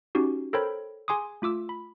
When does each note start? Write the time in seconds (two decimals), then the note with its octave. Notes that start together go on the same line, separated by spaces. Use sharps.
0.15 C#4 D#4 F#4 G4
0.53 A4 A#4 C5 C#5 G5 B5
1.08 G#4 G#5 C6 D6 D#6
1.42 A3 F4 D6 E6
1.69 B5